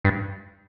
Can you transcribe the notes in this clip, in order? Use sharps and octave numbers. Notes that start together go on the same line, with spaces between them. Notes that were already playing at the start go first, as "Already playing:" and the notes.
G2